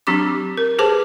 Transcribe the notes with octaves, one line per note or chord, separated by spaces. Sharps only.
F#3 C4 D4 G4 C#6 D6
A#4
G4 G#4 B4 C5 A5 D6